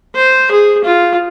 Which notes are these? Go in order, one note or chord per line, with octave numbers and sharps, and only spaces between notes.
C5
G#4
F4